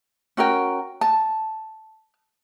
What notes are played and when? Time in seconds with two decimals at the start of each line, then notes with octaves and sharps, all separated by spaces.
0.37 C#4 F#4 A#4 G5
1.01 A5